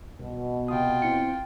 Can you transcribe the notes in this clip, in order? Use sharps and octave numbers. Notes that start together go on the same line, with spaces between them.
C2 B2
C3 F4 G5 D#6
C4 E4 C#7